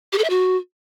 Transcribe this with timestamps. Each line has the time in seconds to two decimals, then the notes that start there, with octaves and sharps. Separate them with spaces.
0.12 G4
0.18 A4
0.24 E5
0.30 F#4